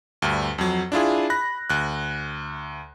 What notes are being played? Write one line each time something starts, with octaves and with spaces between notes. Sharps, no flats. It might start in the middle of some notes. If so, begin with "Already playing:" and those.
D2 G2
F2 F#3
D4 E4 F4 G#4
B5 F#6 A#6
D2 F#6